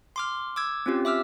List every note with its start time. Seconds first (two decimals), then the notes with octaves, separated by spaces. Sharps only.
0.16 C6 D6 F6
0.56 D6 E6 G#6
0.86 C4 C#4 F4 G4
1.05 E5 D6 E6 F6